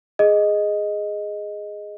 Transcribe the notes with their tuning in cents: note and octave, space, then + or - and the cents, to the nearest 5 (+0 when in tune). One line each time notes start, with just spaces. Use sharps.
G#4 +0 D#5 +0